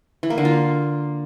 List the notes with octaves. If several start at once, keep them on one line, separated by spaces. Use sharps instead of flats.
E3
A#3
D3
F4